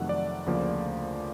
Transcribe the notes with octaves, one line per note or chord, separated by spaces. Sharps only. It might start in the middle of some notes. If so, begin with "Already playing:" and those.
Already playing: F2 C3 D#3 F#3 A3 F#5
D5
D2 C#3 F3 A#3